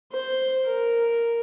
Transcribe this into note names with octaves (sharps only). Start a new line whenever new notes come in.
C5
A#4